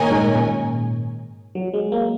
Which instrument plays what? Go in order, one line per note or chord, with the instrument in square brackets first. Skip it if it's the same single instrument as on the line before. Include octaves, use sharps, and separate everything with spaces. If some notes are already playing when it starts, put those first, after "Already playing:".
Already playing: [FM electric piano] A#2 D#3 [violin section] C#4 A#4 D#5 G#5
[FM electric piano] G#2
A#2
F#3
G#3
A#3